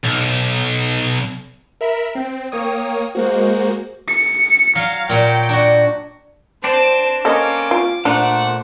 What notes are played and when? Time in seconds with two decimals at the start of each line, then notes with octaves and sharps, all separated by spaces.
0.04 B1
1.81 A#4 E5 B5
2.15 C4 G5
2.52 A#3 C#5 D#6
3.15 G#3 A#3 F#4 C5
4.08 C#7
4.76 F#3 F5
5.09 A#2 F#3 G5
5.49 D4 F#4
6.64 C4 D4 C5 A5
7.25 A#3 C#4 A4 D#5 D6
7.71 F4
8.05 A#2 A3 D4 C5 F#5